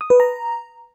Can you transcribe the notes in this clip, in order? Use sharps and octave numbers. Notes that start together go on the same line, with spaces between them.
D#6
B4
A#5